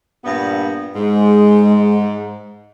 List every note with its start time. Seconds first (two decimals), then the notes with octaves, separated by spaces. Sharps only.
0.25 G2 A#2 B3
0.95 G#2 G#3